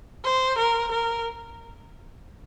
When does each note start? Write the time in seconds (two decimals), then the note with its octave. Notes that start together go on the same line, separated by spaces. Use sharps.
0.24 C5
0.58 A#4
0.91 A#4